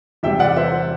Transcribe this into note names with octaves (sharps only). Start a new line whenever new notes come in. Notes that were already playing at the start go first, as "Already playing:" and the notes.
E2 C3 G3 E5 G5
D5 F#5
C5 E5